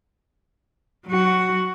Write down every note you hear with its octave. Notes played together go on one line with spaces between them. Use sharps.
F#3 F#4